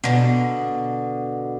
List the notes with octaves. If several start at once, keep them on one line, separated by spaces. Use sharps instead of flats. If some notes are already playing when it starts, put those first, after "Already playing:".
B2 D3